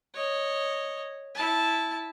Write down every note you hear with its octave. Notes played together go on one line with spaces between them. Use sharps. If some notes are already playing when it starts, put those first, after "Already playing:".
C#5 D#5
E4 A5